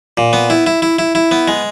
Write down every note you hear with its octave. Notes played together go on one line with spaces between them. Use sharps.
A#2
B3
E4
E4
E4
E4
E4
B3
G#3